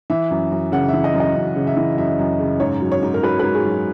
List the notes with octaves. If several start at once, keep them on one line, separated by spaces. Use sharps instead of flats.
E3 E5
F#2
F#2
C#3 F#5
E3 E5
D#5
F#2
D#5
F#2
C#3
E5
E3
F#2 E5
F#2
C#3
G#2 C#5
F#3
C#5
G#2
A#4
F#3 B4
G#2 B4
G#4
F#3